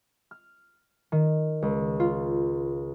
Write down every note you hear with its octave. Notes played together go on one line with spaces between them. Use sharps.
F6
D#3
C#2
F4